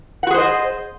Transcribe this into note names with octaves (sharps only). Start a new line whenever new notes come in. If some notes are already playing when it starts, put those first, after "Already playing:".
F#4 G#4 C5 D#5 F#5